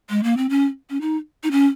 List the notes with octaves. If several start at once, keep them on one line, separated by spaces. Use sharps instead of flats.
G#3
A#3
C4
C#4
C#4
D#4
D#4
C#4